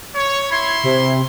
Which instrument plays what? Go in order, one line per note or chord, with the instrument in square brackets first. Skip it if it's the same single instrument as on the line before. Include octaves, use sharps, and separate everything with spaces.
[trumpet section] C#5
[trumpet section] E4 B5 C6 [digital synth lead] G#6
[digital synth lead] C3